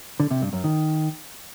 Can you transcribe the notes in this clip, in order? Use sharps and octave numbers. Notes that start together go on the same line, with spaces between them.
D3
C3
G2
F#2
D#3